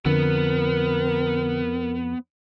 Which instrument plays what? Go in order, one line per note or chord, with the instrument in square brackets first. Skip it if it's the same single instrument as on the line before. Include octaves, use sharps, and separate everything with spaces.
[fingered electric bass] F2 [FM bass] D3 [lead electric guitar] B3 [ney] A#4